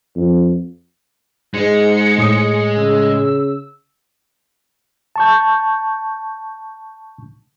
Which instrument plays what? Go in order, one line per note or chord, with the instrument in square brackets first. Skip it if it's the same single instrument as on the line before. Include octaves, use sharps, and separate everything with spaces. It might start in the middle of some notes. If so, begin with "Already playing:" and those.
[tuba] F2
[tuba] G#2 [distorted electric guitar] G#3 [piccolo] C#7
[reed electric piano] A2 D#6
[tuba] C#3 [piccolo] E6
[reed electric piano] A5 C#6 G6